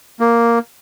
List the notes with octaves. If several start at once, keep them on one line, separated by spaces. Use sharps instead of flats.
A#3